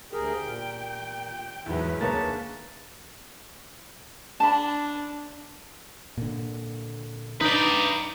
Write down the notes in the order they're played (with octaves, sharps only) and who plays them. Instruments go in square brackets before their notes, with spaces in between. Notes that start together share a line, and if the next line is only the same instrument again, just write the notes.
[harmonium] D2 G#4 A#4 [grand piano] G4 [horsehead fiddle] G5
[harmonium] A#2
[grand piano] E2 G#2 F#3 [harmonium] E3 E4 [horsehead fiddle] G#4 B4
[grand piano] D2 A6 [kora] A#3 D#4 C#5 [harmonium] A5
[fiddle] D4 [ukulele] A5 B5
[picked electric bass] A#2 D3
[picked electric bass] D4 [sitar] D#4 [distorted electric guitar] B4 D5